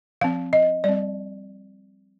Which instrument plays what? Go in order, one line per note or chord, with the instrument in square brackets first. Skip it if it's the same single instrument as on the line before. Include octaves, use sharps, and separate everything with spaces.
[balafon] F3 C4 F5
D#5
G3 C4 D5